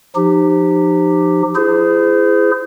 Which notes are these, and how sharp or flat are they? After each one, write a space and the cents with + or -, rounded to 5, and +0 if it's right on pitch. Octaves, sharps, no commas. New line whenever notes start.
F3 +0 D#4 -30 G4 +0
E4 +30 G#4 +0 C5 -30